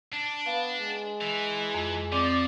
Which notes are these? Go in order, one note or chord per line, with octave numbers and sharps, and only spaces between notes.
D4
B3 F5
G#3
E3
F2
F3 C4 D5